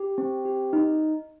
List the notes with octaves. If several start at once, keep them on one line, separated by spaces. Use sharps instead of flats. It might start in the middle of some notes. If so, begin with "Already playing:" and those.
Already playing: G4
C4
G4
D#4